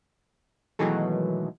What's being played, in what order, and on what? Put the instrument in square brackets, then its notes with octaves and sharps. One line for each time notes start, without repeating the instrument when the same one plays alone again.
[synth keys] B2 D#3 E3 F#3 G#3 A3